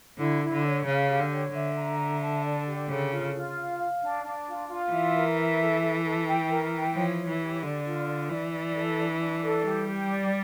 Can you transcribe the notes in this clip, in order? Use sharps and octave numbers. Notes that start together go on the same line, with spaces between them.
D3 E4
E4
D3
C#5
C#3 F5
G4
D3
C#5
D3 E5
A#5
E5
A5
D5
G4
C#3 A4
F4
F4
F5
F5
D4
D4
F4
F4
E3 E5
A#4
E5
A4
A4
A4
G5
A#4
G5
F3 C#5
C#5
E3
G4
D3 D5
F4
D5
E3 D5
D5
A4
D4
D4
A4
G3 G4
G4
D5